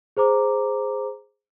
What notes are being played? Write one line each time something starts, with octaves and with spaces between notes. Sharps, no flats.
G#4 C5 A#5 D6